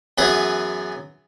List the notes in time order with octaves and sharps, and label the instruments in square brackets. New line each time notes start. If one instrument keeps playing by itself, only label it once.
[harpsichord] F#2 E3 B3 G#4 B4 D#6